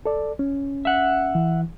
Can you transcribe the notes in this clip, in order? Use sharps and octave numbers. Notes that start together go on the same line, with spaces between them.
A4 D5
C#4
E5 F#5
E3